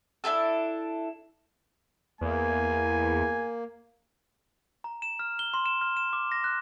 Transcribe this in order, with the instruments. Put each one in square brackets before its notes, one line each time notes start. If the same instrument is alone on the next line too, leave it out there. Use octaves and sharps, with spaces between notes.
[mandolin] D4 E4 G#4 A4
[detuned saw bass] E2 [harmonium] A#3 [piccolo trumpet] G#5
[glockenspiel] A#5
E7
F6
G7
C6
E7
F6
E7
D6
A#6
F#6